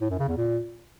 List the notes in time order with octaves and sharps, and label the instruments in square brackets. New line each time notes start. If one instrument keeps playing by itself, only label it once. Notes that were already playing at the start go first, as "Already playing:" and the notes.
[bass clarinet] A2
F#2
C#3
E2
A#2